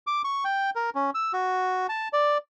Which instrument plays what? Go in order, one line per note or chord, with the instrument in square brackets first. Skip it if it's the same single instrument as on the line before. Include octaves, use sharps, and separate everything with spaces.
[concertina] D6
C#6
G5
A#4
C#4
E6
F#4
A5
D5